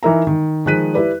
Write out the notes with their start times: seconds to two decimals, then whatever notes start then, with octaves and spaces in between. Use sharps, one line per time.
0.03 E3 D#4 A#4 E5 A#5
0.27 D#3
0.66 D#3 F3 G#3 F#6 B6 D#7
0.94 E4 G4 B4 D5